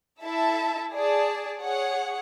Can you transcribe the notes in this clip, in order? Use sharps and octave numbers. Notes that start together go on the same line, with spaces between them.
E4 A4 E5 A5
G#4 D5 A5
G#4 C#5 F#5